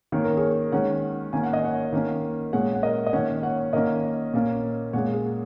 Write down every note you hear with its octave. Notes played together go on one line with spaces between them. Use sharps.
D#3 A#3 C#4 C#5
A#4
G#4 C#5
D#3 G#3 C#4 C#5 F#5
D#3 A#3 C#4 G#5
F#5
D#5
C#5 F#5
D#3 A#3 C#4
A#2 G#3 C#4 C#5 F#5
F#5
A#4 D#5
D#5
D#3 A#3 C#4 C#5 F#5
C#5 F#5
D#3 A#3 C#4 A#4 D#5
A#2 A#3 C#4
A#2 G#3 C#4 C#5 F#5
G#4